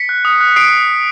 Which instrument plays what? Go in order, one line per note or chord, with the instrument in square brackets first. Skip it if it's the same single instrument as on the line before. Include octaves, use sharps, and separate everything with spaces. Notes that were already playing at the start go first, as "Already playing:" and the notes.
Already playing: [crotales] B6 C#7
F#6
D#6
F#6
D#6 C7 D7